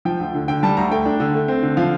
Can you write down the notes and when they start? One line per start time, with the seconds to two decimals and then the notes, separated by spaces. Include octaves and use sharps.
0.05 F3 G5
0.20 D2
0.34 D3
0.48 D3 G5
0.63 G3 A5
0.77 D2 A#5
0.91 A3 G5
1.06 D4
1.20 D3
1.34 A3
1.48 C4
1.62 D3
1.77 F3 F5